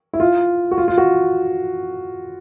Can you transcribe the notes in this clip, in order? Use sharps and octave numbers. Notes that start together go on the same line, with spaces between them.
E4
F4
F#4
F4
F4
F#4